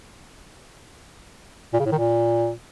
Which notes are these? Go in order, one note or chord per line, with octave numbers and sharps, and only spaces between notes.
A#2
C#3
A2
D#3
A#2